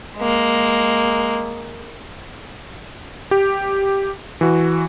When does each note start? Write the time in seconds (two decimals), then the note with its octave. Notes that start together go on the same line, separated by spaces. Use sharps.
0.18 G#3 A#3
3.31 G4
4.41 E3 F#4